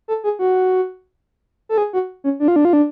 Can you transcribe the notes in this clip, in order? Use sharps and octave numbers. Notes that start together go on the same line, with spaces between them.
A4
G#4
F#4
A4
G#4
F#4
C#4
D4
F4
D4
F4
D4